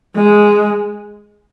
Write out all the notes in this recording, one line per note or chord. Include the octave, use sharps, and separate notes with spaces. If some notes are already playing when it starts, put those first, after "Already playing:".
G#3